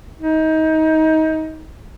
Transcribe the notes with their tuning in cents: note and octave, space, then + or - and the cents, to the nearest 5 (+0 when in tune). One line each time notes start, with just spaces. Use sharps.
D#4 +25